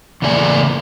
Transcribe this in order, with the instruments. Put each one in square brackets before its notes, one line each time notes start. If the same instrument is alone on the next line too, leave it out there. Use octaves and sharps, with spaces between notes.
[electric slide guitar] E2 C#3 A3 A#3 D5 G#5